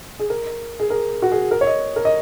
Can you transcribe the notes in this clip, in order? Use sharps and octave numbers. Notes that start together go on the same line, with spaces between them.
G#4
A#4
G#4
A#4
F#4
G#4
A#4
C#5
D#5
A#4
D#5